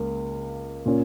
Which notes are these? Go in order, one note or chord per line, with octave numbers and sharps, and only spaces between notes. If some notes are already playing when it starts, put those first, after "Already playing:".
Already playing: C#2 C#3 A#3 C#4
A#2 A#3 C#4